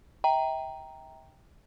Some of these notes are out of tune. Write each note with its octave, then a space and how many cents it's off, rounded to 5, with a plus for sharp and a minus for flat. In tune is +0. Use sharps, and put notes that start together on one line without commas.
E5 -35 G5 +0 A#5 +0